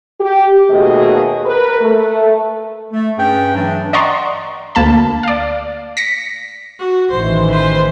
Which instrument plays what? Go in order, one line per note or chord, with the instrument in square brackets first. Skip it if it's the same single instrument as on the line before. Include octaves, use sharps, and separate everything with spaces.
[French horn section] G4
D#2 B2 A3 G#4 D#5
A#4 B4
A3
[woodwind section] A3
G2 C#4 G#4 B4 G5
G2 E3 F#3 A3 D4
[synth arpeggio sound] D5 D#5 F#5 A#5 C6 C#6
D2 A#3 A5 B5
D5 F5
A#6 B6 C#7
[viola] F#4
[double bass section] A1 D#3 E3 [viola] C5
[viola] B4 C5